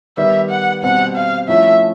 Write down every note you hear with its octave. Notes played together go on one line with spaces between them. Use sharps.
D#3 G3 B3 E5
F#5
B2 G3 C4 F#5
F5
F3 A3 C#4 E4 E5